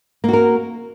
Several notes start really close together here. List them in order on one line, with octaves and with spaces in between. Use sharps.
A#3 F#4 A#4